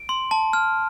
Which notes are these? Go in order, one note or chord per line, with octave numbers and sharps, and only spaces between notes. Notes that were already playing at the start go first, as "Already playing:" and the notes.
Already playing: D7
C6
A5
F6